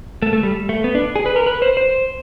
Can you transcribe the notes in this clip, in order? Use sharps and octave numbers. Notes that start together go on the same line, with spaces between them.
A3
A3
G3
A3
B3
D4
G#4
B4
A#4
B4
C5
C5